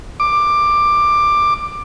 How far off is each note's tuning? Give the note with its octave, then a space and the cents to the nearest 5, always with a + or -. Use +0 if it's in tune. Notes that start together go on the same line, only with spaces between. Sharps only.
D6 +10